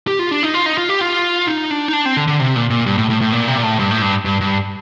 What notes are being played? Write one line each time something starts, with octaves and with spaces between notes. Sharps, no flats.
G4
F4
D4
D#4
F4
D#4
F4
G4
F4
D#4
D4
D#4
D4
C4
D3
D3
C3
A#2
A#2
G2
A2
A2
A2
A#2
C3
A#2
A2
G2
A2
G2
G2
G2